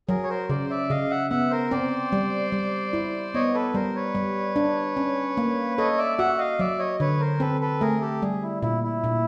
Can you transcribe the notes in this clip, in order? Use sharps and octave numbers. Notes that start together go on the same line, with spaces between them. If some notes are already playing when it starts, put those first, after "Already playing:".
F#3 G#4 A#4
C#5
A#4 C5
C#3 C5 D5
D5 E5
C#3 D#5 F5
E5 F#5
B3 E5 F#5
A#4 C5
C4 C5 D5
G3
G3
E4
B3 C#5 D#5
A4 B4
G3 A#4 C5
B4 C#5
G3
D4
C#4
A#3
A4 C#5 D#5
D5 E5
F#4 E5 F#5
D#5 F5
F#3 D5 E5
C#5 D#5
D3 B4 C#5
A#4 C5
C4 A4 B4
A4 B4
A3 G#4 A#4
G4 A4
G3 G#4
E4
A#2 E4
E4
A#2